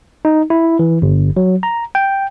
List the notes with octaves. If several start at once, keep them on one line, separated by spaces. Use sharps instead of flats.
D#4
E4
E3
G1
F#3
A#5
G5